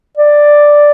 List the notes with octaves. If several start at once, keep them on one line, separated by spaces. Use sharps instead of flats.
D5